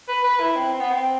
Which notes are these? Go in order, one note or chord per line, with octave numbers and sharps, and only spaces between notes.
B4
B4
E4
C4
C4
B3
C4